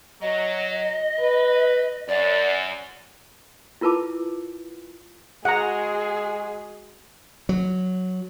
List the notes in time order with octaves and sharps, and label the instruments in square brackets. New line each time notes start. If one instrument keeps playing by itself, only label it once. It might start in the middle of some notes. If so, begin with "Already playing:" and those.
[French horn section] F#3 [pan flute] D#5
[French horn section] B4
[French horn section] F#2 [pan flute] D5
[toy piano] E4 F4 A#4 B4 A5 D6
[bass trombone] G#3 [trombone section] F#4 [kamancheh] G#4 [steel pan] F#5 A#5
[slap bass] F#3